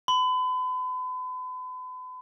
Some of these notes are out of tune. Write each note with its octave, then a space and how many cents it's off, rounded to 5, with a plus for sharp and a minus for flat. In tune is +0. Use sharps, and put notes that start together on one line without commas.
B5 +40